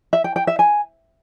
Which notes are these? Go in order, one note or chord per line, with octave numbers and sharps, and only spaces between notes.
E5
G5
G5
E5
G#5